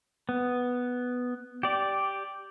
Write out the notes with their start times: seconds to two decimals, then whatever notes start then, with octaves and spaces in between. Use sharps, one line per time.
0.29 B3
1.63 G4 D5